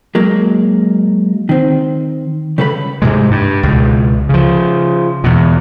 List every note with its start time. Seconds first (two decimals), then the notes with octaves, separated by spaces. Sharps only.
0.15 F#3 G#3 A#3
1.49 D#3 C4
2.58 C#3 G3 A4 B4 D5 B5
3.02 G#2 C3 G#3
3.31 G2
3.63 C#2 B2
4.29 C#3 F3
5.24 E2 B2